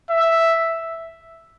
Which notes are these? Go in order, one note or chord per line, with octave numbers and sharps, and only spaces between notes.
E5